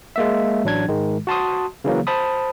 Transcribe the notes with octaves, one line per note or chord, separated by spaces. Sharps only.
G#3 A#3 E5
A1 F#3 D4 G#6
G#2 D#3 G#3
F#4 A5 C6 D#6
C#3 E3 F#3 A#3
C5 A5 B5 D#6